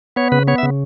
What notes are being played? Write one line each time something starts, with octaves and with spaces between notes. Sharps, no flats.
B3 C#5
C#3 B4
B3 C#5
E5
C#3